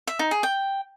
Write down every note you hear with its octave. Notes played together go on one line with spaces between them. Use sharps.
E5
D#4
G#4
G5